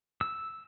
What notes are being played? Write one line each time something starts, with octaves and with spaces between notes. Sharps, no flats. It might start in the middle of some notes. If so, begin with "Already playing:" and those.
E6